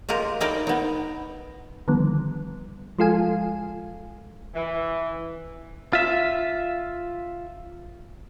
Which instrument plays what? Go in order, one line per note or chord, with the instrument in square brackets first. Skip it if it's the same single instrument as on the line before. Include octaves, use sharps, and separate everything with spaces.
[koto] G#3 F4 G4 A#4
D#4 E4 A#4 D5 D#5 G5
B3 D#4
[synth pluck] D3 D#3 F3 G3 B3
F3 G#3 F4 A4 F5 G#5
[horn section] E3
[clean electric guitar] F4 E5